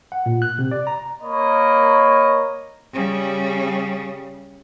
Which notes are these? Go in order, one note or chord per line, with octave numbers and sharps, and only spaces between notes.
F#5
A#2
F#6
C3
D5
A#5
A#3 C#5 D#5 B5
C#3 G3